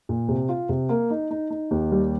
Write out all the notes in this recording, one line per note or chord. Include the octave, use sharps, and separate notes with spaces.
A#2
C3
F4
C3
A#3
D#4
D#4
D#4
D#2
G3